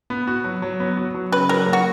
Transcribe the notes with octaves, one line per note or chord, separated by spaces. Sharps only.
B3
F#4
F#3
F#3
B3
F#4
F#3
C#3 B4
F#3 A#4
A#3
F#4